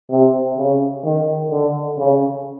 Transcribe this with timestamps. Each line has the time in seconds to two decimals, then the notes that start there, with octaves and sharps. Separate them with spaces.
0.11 C3
0.58 C#3
1.04 D#3
1.51 D3
1.97 C#3